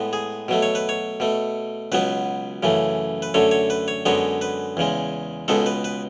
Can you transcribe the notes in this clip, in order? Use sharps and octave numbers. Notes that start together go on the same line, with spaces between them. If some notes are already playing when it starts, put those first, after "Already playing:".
Already playing: A2 G#3 B3
G#4
B2 F#3 A3
C#5
B4
C#5
B2 A3
C#2 B2 F#3 B3 B4
F#2 C#3 E3 A3
B4
F#2 D3 A3 C#5
C#5
B4
C#5
F#2 D3 G#3 B3 C#5
B4
E2 C#3 G#3
C#2 B2 G#3 B3 A4
B4
B4